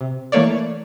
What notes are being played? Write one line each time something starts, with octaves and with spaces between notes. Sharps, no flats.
C3
E3 A3 A#3 C#5 D5